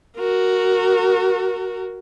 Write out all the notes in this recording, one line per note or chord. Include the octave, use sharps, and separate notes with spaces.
F#4 A#4